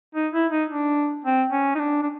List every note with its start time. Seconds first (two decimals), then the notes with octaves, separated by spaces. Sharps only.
0.15 D#4
0.33 E4
0.52 D#4
0.70 D4
1.24 C4
1.52 C#4
1.75 D#4
1.79 D4
2.02 D4